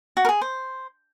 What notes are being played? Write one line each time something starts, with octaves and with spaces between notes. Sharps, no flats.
F#4
A#4
G#4
C5